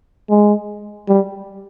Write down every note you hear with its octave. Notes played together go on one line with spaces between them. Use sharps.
G#3
G3